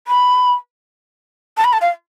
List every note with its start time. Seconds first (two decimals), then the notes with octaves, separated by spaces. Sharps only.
0.08 B5
1.57 A5
1.65 B5
1.73 A5
1.81 F5